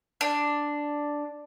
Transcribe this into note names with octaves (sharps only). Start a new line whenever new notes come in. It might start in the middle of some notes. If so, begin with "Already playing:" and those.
D4